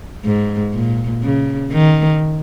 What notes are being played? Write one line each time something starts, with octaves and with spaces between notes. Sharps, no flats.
G#2
A#2
C#3
D#3